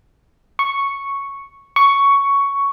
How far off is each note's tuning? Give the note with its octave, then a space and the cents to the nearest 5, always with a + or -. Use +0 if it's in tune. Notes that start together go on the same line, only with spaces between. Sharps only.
C#6 -5
C#6 +10